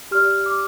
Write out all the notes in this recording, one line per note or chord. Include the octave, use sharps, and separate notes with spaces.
G4 D5 F6
D6